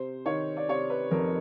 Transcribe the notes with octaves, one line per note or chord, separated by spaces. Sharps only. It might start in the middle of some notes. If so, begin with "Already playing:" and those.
Already playing: C3 C5
D#3 C#5
D5
C3 C#5
B4
F2 A#4